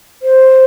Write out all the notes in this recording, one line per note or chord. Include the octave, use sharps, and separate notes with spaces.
C5